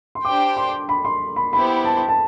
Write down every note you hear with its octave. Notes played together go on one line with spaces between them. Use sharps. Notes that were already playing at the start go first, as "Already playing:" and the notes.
C6
D4 G4 C5 G5 D6
C6
B5
C6
B5
B3 E4 G4 C5 B5
A5
A5